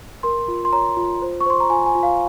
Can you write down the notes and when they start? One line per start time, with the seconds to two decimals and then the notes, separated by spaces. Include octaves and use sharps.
0.23 A#4 C6
0.48 F4
0.65 C6
0.72 C#5 A#5
0.97 F4
1.22 C5
1.41 C#6
1.46 C5 C6
1.60 A#5
1.70 F4 G#5
1.86 G#5
1.95 F4
2.03 F5